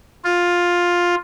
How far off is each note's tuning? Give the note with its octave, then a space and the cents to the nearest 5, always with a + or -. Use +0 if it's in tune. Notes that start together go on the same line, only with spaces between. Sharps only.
F4 +10